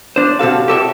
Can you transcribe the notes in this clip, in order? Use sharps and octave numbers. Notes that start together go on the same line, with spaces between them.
D4 C5
C3 F#4 A4 F5
G4 A4 C#5 E5